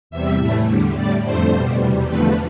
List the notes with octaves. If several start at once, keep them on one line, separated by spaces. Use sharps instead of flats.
E2 C3 G3 E5
A2 E3 A3
E2 D3 G3
A2 G3 D5
F2 D3 A3 C5
B2 G3
E2 C3 G3
E2 D3 F3 A3 B4